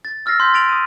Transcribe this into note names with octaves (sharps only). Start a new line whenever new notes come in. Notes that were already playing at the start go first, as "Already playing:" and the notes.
A6
E6 F6 A6 A#6 C7
C6 G6 B6
A6 D7 F7 F#7
D#6 D#7